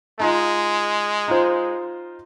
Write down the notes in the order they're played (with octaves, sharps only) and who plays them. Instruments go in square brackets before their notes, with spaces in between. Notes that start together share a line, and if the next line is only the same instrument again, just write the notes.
[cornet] G#3 [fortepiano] D#4 F4
[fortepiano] D#4 F4 C5